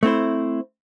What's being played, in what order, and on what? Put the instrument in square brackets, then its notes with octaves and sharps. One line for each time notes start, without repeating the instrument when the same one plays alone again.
[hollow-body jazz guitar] A3 C4 E4 C5